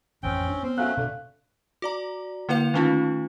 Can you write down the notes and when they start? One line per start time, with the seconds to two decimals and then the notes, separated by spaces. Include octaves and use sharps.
0.23 A1 F2 C4 C#4 G5
0.48 D4
0.63 B3 C4
0.78 F#3 A3 C#4 F5 F#6
0.97 B2 D3 A3
1.82 F#4 D5 A#5
2.49 D3 A#3 E4 B4 F5 F7
2.74 D#3 A3 C#4 D#4 F4